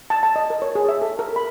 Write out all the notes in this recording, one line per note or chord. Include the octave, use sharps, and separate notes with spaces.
A5
A5
D#5
A#4
C#5
G#4
E5
A4
A#4
B5